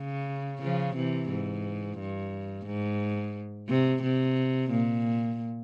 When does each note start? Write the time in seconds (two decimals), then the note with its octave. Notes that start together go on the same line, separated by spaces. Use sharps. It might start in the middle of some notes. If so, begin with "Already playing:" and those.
Already playing: C#3
0.61 C#3 F3
0.96 C3 E3
1.30 G#2
1.99 G2
2.66 G#2
3.69 C3
4.03 C3
4.71 A#2